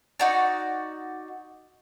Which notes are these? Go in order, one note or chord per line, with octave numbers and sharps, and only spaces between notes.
D#4 F#4 D5